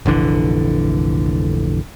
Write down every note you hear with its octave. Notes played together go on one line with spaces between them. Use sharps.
F1 A#1 D3 E3